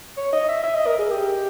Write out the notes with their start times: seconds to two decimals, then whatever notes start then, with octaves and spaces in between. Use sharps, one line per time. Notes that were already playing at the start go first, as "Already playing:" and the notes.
0.17 C#5
0.33 D#5
0.49 E5
0.63 E5
0.75 D#5
0.87 A#4
0.99 G#4
1.11 G4